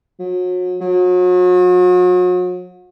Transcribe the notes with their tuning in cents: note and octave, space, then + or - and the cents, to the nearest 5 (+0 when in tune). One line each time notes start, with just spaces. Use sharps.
F#3 -35
F#3 -40